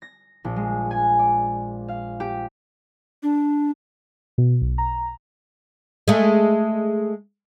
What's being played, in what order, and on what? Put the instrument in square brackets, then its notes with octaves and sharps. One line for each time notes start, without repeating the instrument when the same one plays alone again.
[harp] A#6
A#1
G#3
G#5
D5
F5
G4
[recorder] D4
[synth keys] B2
B1
A#5
[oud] G#3 A3